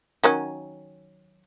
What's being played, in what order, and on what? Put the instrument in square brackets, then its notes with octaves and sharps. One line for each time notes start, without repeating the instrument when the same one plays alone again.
[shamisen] D#3 F#3 C#4